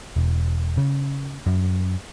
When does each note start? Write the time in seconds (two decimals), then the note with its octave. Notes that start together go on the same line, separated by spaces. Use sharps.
0.16 E1
0.77 C#3
1.47 F#2